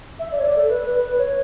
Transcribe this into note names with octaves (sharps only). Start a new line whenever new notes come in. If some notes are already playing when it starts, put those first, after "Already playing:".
E5
D5
C#5
D5
A4
B4
B4
C#5